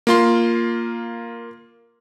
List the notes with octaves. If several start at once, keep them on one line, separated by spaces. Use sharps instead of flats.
A#3 F4 C6